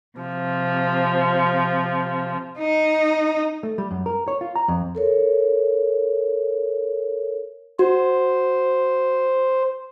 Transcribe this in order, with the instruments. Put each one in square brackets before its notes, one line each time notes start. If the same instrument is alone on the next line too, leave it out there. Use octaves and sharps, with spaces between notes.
[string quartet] C3 F3
[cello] D#4
[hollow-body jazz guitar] A3
G3
F#2
A#4
C#5
F4
A#5
F2
[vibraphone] A4 A#4 C#5
[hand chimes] F#4 [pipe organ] C5